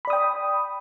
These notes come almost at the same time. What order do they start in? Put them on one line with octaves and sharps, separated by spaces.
B5 D5 D#6 G5